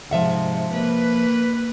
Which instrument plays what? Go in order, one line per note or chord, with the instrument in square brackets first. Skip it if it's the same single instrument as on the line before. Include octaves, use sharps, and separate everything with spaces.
[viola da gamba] G#2 C3 [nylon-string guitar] F3 E5 F#5
[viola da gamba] A#3 B4